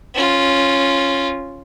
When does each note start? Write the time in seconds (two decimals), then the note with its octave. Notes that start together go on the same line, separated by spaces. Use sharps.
0.15 C#4 F4